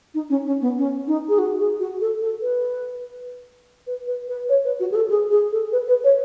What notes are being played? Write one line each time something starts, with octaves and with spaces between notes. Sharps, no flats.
D#4
C#4
C#4
B3
C#4
D#4
G#4
F#4
G#4
F#4
A4
A4
B4
B4
B4
B4
C#5
B4
F#4
G#4
A4
G#4
G#4
A4
B4
B4
C#5